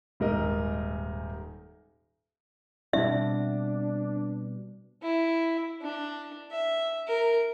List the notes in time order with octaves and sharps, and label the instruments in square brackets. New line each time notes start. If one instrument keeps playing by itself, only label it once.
[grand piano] D#1 G#2 A#4 D#5
[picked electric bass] B2 G3 C4 [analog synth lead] D4 [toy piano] E5
[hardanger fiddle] E4
D4
E5
A#4